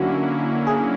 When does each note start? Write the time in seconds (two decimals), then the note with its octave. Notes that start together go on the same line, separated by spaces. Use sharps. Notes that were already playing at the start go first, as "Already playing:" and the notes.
Already playing: D3 F#3 A#3 C#4 E4 F#4
0.67 G#4